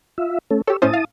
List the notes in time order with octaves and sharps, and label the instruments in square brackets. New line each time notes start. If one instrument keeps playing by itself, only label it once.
[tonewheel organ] F4 E5
A3 C#4 A4
[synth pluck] G4 A4 [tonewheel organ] C#5 E6
[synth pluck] A2 C#4 C5 [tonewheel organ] E4 A5 D#6
[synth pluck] F5